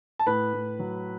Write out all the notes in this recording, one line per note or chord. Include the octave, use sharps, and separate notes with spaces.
A5
A2 B4 B5
A2
F#3